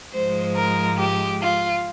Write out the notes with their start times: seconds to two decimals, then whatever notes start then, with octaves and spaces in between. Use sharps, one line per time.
0.12 G#2 F3 G#3 C5
0.55 A#4
0.98 G4
1.40 F4